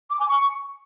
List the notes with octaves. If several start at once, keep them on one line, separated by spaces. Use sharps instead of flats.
D6
G#5
C#6